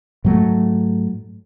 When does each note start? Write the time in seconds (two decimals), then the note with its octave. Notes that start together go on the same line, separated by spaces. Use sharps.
0.24 G#2 F#3 A3